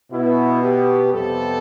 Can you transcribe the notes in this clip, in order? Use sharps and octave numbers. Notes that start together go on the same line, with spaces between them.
B2 B3 E4
G4
F2 C3 G3 B3 A4